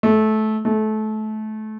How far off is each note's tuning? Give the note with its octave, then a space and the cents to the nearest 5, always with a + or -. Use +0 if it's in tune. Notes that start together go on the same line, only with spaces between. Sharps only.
A3 -20
A3 -25